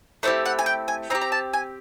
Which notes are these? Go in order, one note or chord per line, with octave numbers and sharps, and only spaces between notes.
A3 C4 E4 G4 D5
F#5
G#5
G5
G#5
C4 D#4 G4 A#5
A#5
A5
G#5